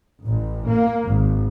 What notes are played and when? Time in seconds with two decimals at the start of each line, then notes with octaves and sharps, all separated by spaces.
0.23 A1
0.68 A#3
1.05 G#1